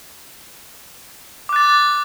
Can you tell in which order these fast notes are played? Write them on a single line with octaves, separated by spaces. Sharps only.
D6 F#6 A6